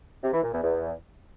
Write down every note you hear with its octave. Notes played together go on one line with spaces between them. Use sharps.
C3
E3
A#2
E2
E2